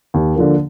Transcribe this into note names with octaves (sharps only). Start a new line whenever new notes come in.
D#2
D3 F3 A#3